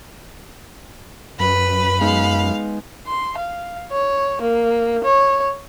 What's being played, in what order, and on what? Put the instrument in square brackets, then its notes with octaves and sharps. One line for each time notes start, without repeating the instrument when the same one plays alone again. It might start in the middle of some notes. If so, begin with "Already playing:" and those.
[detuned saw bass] F#2 [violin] B4 [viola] B5
[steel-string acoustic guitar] G#3 B3 D#4 [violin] F5
[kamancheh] C6
F5
C#5
A#3
C#5